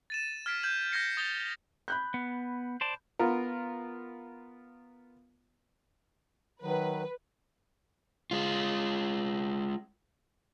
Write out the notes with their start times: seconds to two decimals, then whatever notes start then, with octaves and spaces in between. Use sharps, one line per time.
0.10 A6 D#7 E7
0.46 F6 G#6 A6 B6 C7 D7
0.63 G6 G#6 F#7
0.92 F6 G6 G#6 A#6 C7 C#7
1.17 D#6 G6 A6 F7 G7
1.88 B5 F#6 G6
2.14 B3
2.81 C5 D5 A5
3.19 B3 F4 A#4
6.63 D#3 F#3 B4
8.31 G#3 F4